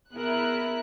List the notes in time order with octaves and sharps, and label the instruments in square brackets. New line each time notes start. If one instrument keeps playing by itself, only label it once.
[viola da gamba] B3 G#4 A#4 [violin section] E4 F#6